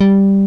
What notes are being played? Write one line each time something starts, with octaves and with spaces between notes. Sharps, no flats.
G3